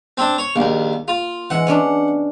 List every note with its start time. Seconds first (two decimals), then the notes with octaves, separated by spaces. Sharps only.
0.17 C4 D4
0.38 C#5
0.56 A#1 D#2 A#3
1.08 F4
1.50 E3 G#3 F#5
1.67 B3 C#4 D4